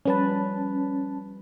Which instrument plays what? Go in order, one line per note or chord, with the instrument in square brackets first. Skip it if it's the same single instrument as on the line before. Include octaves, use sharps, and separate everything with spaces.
[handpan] F3 G3 B4 [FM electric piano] C#4 A5